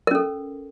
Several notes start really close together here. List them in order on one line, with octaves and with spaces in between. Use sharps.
A#4 C#4 A4